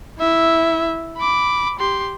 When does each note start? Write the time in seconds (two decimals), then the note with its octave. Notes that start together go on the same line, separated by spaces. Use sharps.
0.19 E4 E5
1.17 B5 D6
1.79 G4 C6